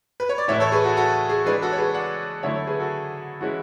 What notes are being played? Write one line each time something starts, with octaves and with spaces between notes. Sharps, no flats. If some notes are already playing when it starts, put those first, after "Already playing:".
B4
C#5
D5
A2 E3 A3 E4 C#5 E5
A4 C#5
G#4 B4
F#4 A4
F#4 A4
G#4
E3 G#3 D4 G#4 B4
F#4 A4
C#5
G#4 B4
D5 F#5
D3 F#3 A3 E4 C#5 E5
A4 C#5
G#4 B4
F#4 A4
E3 G#3 C#4 E4 F#4